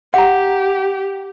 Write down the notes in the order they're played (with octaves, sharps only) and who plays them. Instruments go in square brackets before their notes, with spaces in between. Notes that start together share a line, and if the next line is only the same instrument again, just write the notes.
[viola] G4 [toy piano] F#5 A#5